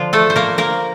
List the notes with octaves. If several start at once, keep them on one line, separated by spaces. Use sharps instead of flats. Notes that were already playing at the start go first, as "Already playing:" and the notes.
Already playing: D3 F3 D4 F4
A3 A4
C5
A#3 A#4
A#3 A#4